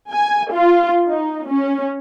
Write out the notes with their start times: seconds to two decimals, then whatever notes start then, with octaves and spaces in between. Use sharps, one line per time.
0.12 G#5
0.52 F4
1.07 D#4
1.48 C#4